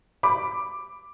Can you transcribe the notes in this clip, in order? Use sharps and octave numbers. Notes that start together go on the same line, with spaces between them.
B5 D6